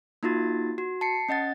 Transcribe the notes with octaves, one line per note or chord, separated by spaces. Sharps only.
A#3 D#4 F4 F#4 A6
F#4
A5 C7 C#7
C#4 D#5 F#5 A6